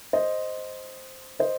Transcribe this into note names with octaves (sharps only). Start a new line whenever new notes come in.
C5 D#5
C5 D#5